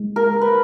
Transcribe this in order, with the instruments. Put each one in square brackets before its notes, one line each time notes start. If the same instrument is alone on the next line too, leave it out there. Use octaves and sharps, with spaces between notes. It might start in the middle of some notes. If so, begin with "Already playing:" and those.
Already playing: [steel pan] G#3
[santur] A#4
B4